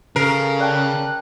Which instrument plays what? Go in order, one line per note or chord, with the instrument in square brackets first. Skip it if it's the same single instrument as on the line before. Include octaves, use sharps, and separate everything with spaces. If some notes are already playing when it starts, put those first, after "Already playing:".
[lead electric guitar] C#3 [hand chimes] A4 C7 [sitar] A#4
[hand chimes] D5 G5 A5 [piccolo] F#6